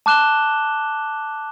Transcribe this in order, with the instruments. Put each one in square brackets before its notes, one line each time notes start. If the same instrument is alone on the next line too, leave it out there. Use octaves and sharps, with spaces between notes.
[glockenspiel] A5 D6 F#6 E7 G7